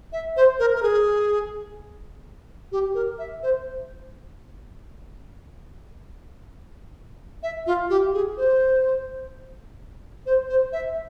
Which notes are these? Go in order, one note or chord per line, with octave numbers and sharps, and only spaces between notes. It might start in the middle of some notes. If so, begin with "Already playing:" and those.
E5
C5
A#4
A#4
G#4
G4
A#4
E5
C5
E5
F4
G4
G#4
C5
C5
C5
E5